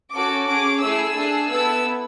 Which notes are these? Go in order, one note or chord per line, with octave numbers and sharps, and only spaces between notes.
C#4 F#4 A4 D6
C#4 G#4 D6
A3 E4 G#4 E6
A3 D4 G#4
B3 E4 A4 E6